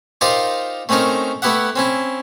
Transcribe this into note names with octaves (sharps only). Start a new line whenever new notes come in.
D#4 F4 G4 A#4 C5 D5
A3 C4 C#4 D#4 A#4
A3 B3 E4 G4 E5 F#5
C4 C#4 E4